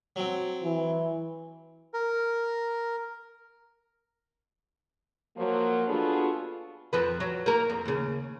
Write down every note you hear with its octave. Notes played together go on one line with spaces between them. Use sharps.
F#3 C4
E3
A#4
F3 F#3 A#3
B3 D4 F4 F#4 G#4 A4
F2 F3 B4
F#3
A#3 A#4
F2
D#2 C#3